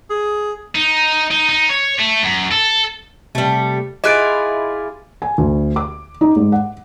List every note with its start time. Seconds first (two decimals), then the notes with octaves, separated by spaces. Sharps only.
0.10 G#4
0.75 D#4
1.31 D#4
1.50 D#4
1.70 C#5
2.00 A3
2.23 F#2
2.51 A4
3.35 C3 G3 A3
4.04 E4 F4 G#4 D#5 D6 F#6 A6 D7
5.22 G#5
5.38 D2
5.76 D6
6.21 D#4
6.36 G#2
6.52 F#5